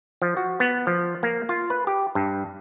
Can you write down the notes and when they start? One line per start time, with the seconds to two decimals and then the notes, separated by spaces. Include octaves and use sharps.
0.22 F3
0.37 F#4
0.60 B3
0.87 F3
1.23 A#3
1.49 F4
1.70 B4
1.87 G4
2.15 G2